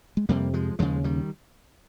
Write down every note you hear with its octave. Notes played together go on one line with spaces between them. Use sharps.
G#3
F2 C3 G3 A#3
F3 G#3
D#2 C#3 F3 G#3
D#3 G3